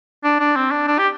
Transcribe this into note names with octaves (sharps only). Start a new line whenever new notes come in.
D4
D4
C4
D4
D4
G4